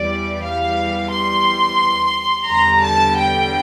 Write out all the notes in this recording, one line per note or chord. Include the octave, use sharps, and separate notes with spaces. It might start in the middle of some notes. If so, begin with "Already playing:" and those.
Already playing: E2 E3 G3 D5
F5
C6
E2 D3 G3 A#5
A5
G5